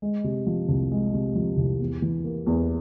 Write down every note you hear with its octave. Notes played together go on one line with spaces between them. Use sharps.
G#3
C3
F3
C2
G#3
C3
F3
C2
E2
E3
A#3
E2